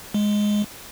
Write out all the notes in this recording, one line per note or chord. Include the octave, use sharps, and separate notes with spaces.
G#3